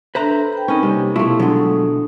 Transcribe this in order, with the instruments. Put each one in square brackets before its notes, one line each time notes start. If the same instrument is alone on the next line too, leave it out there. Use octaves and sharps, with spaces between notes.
[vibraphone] D4 E5 [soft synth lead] A4 [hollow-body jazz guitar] B4 C5 A#5
[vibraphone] G5 B5
[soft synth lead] C4 [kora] C#4 D#5 [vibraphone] D#4 A#4 B5
[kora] C3 [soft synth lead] G3 [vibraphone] A#3 D#4 C#5
[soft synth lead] B2 [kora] F3 A3 [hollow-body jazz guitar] E4 [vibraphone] C6 C#6
[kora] D3 [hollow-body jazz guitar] F#3 G#3 [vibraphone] D4 D#6